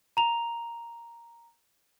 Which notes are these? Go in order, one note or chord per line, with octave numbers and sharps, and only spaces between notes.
A#5 F7